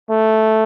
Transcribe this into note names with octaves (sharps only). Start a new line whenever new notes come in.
A3